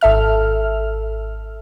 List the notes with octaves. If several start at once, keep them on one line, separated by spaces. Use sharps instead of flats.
G#1 A4 E5 F6